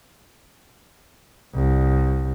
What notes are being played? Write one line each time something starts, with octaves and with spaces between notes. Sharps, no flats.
C2